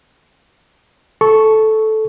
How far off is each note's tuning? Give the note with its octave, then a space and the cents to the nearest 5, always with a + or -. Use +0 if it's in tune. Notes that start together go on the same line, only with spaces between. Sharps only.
A4 -10 C#6 +0